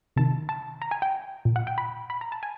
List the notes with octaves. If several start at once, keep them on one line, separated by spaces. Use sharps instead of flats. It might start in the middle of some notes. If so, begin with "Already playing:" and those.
C3 D#3 A5
A5
A#5
G#5
G5
A#2
F#5
G5
B5
B5
A#5
A5
G#5